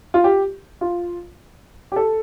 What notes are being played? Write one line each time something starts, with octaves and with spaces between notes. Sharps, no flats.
F4
G4
F4
G4
A4